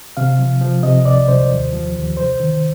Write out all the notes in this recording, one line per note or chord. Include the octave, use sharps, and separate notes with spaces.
C3 F5
F3
F3
C3 D#5
C2 D5
C2 C5
D#2
F3
D#2
C2 C5
D#3